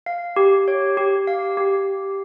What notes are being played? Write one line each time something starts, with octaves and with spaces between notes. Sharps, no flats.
F5
G4
C#5
G4
F5
G4